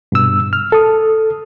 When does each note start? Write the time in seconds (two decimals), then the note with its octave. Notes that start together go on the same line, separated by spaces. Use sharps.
0.12 G2 B2 E6
0.53 F6
0.72 A4 D#6